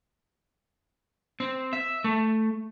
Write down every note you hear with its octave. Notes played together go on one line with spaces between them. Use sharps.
C4
E5
A3